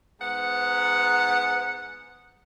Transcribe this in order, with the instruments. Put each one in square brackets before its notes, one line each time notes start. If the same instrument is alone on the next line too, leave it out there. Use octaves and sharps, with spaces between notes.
[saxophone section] G#2 B3 F#5